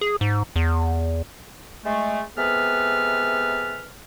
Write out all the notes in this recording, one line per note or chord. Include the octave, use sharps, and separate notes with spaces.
G#4
G#2
E2
G#3 A3
C3 G#3 B3 A4 B4 F6